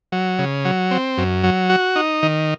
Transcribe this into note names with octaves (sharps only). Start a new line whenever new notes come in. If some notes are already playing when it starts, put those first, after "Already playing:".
F#3
C#3
F#3
C4
F#2
F#3
F#4
D#4
D#3